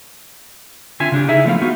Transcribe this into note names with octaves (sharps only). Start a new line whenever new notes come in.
D3 C4 F4 E5 G#5
C#3 D4 G4
D#4 E4 G#4 E5
F3 A3 B3 D#5 F5
B3 D#4 F4 F#4